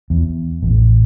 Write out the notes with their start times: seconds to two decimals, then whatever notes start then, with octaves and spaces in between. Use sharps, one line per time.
0.10 E2
0.63 A1